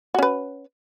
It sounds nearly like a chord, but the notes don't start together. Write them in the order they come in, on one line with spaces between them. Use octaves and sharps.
F#4 C#4 B4